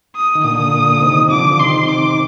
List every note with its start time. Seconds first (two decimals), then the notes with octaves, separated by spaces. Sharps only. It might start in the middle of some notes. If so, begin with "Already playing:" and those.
0.15 D#6
0.35 D#3
0.44 A#2 D3 D#6
1.01 C3 D#3
1.30 D3 F3 D6
1.50 F3
1.59 C3 D#3 C6
1.88 D6